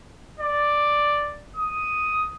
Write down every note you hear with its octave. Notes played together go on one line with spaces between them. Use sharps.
D5
D#6